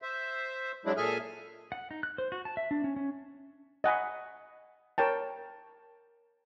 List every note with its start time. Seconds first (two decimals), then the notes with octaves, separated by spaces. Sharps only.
0.02 C5 E5
0.85 F#3 G#3 D4 E4
0.97 A#2 G#4 A4 E5 G#5 F6
1.72 F#5
1.91 D#4
2.03 F#6
2.18 C5
2.32 F#4
2.45 A5
2.57 E5
2.71 D4
2.84 C#4
2.96 C#4
3.84 D#5 F#5 G#5 B5
4.98 A#4 C#5 G5 A5